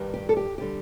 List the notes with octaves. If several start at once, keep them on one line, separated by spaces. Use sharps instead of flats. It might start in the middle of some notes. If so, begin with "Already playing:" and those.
Already playing: G2 D#3 G3
G4
A4
G4
D3 G3 G4